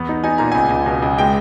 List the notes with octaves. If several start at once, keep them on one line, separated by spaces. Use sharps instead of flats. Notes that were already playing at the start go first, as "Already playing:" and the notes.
Already playing: E2 B3
D#4
D#4 G#5
A#2 A#5
C#2 G#5
C#2
B2
C#2
G#3 G5